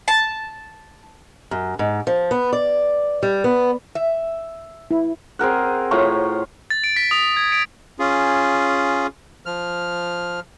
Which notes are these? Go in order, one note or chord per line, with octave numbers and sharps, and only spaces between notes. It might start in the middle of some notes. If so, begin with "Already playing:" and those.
A5
F#2
G#2
F3
B3
D5
G3
B3
E5
E4
C4 G#4 A#4 F#5
A2 F4 A#5 C#6
A6
D7
B6
D#6
G#6
D7
C#4 F4 G#4
F3 F6